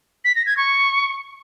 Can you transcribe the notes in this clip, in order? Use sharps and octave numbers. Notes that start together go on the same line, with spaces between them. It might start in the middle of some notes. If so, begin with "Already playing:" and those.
B6
A#6
G#6
C#6